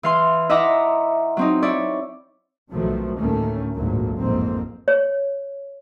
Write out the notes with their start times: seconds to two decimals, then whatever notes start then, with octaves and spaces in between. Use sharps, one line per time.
0.03 E3 F5 C6
0.49 E4 D#5 E5 F#5 A#5 D6
1.37 F#3 C4 D#4
1.62 E4 C#5 D5
2.73 B1 C3 D#3 F3 F#3 A3
3.18 D2 A2 D#3 A3 A#3 C#4
3.74 G#1 D2 A#2 F#3 A3 A#3
4.18 A1 F2 G#2 A#3 C4
4.88 C#5